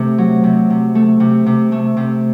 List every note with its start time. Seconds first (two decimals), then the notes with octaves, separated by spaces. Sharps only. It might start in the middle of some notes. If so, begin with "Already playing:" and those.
Already playing: C3 A3
0.18 F#3
0.44 C3
0.70 C3
0.95 A3
1.20 C3
1.46 C3
1.72 A3
1.97 C3